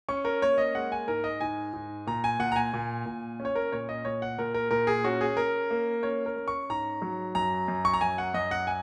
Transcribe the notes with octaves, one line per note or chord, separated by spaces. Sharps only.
C#4 C#6
A#4
A#3 C#5
D#5
G#3 F#5
G#5
G#2 A#4
D#5
G#2 G#5
G#2
A#2 A#5
G#5
A#2 F#5
A#5
G#5
A#2
A#2
C#4
C#5
A#4
A#2 C#5
D#5
A#2 C#5
F#5
A#2 A#4
A#4
A#2 A#4
G#4
C#4 F#4
G#4
C#4 A#4
A#3
C#4 C#5
A#4
C#4
C#6
G#2 A#5
F#3
F#2 A#5
F#2
C#6
A#5
F#2 G#5
F#5
F#2 D#5
F#5
G#5